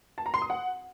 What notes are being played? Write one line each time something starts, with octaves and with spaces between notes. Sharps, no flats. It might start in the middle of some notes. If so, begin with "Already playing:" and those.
A5
A#5
C6
D#6
F#5